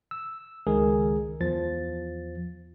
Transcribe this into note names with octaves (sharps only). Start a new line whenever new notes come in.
E6
C#2 D#3 G#3 G#4 A#4
E2 F3 A6